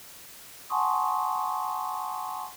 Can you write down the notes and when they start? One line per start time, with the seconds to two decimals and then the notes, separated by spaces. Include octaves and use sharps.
0.70 F#5 G#5 A5 C6 C#6 D#6